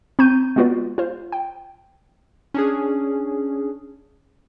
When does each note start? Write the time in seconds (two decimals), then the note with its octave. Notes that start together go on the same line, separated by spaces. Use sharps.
0.19 C4 A#5 C#6 G6 D#7
0.56 G#3 B3 F4 F#4 B4 D5
0.98 F4 C5
1.32 G5
2.54 C#4 D4 G#4